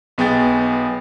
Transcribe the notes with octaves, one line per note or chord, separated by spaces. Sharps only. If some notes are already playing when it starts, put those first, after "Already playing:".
B1 B3 G#4 G5 A6